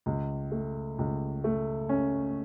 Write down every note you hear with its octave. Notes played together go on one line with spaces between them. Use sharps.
C#2
A3
C#2
A3
C#4